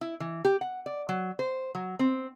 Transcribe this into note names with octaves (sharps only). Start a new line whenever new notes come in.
E4
E3
G4
F#5
D5
F#3
C5
F#3
C4